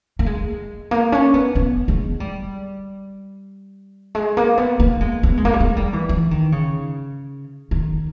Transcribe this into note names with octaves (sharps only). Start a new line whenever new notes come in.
A#3
G#3
A#3
C#4
B3
B3
G#3
G3
G#3
A#3
B3
A#3
G#3
B3
G#3
A#3
G3
G#3
G3
E3
E3
D#3
C#3
D#3